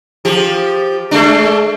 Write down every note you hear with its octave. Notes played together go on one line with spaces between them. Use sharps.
F3 G4
G#3 A3 D4